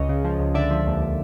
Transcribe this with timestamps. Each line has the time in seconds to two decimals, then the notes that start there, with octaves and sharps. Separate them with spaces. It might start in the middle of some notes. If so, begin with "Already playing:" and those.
Already playing: C#2 C#5 D#5
0.09 C#3
0.24 F3
0.39 C#2
0.54 D3 D5 E5
0.71 F3
0.86 D#2